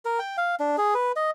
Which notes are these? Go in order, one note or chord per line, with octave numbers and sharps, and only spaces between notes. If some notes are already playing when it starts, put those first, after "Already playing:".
A#4
G5
F5
D4
G#4
B4
D#5